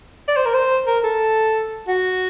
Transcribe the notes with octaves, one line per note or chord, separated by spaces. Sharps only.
D5
C5
A#4
C5
A#4
A4
F#4